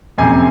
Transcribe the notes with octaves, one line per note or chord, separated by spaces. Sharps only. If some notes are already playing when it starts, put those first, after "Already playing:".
F#1 F2 C3 G#5